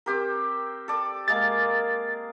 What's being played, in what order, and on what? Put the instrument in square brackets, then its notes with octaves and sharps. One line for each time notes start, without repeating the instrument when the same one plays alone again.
[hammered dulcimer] C4 G4 A#4
A4 D5
[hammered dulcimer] G#3 A#3 A#4 [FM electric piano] A6